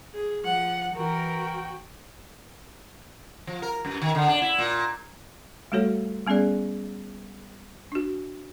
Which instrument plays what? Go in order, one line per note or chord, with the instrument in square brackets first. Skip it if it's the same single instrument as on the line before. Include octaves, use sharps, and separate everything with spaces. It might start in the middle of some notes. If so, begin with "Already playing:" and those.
[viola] G#4
[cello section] F3 [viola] F#5
[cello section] E3 A#4 [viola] F#4 G5
[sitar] F3
A#4
F#2
D#3
D3
D4
E4
A#2
[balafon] G3 A3 F#4 A4 C#5
G3 B3 C#4 G#4 D5
D4 F#4